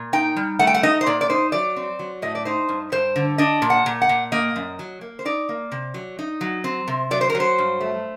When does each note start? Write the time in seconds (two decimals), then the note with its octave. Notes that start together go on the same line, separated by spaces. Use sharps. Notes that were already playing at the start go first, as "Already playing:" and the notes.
Already playing: A#2
0.13 D#4 G5
0.36 G3
0.59 A3 F#5
0.67 G5
0.74 F#5
0.83 D#4 D#5
1.01 C5
1.06 A#2 D5
1.21 D5
1.29 D#4 C5
1.52 F#3 D5
1.76 C4
1.99 F#3
2.22 A2 D#5
2.35 D5
2.45 D#4 C5
2.69 G2
2.92 G2 C5
3.16 D3
3.38 D4 D#5
3.62 A#2
3.70 F#5
3.86 A#2
4.02 F#5
4.09 A#2
4.32 A#3 D#5
4.56 F#2
4.79 F#3
5.01 A#3
5.19 C5
5.25 D#4 D5
5.49 A#3
5.72 C3
5.94 F#3
6.19 D#4
6.41 F#3
6.64 C4
6.88 C3
7.11 F#3 D5
7.21 C5
7.30 A#4
7.35 F#3
7.40 C5
7.58 G2
7.80 A3